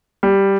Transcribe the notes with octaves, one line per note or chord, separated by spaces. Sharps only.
G3